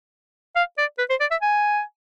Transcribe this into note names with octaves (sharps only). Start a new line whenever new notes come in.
F5
D5
B4
C5
D5
E5
G#5